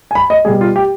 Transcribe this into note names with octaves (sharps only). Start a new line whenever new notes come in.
G#5
B5
D#5
B2 G3 G#4
F4
G4